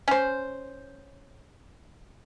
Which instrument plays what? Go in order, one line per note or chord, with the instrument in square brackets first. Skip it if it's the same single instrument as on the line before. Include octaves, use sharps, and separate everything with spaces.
[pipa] C#4 C5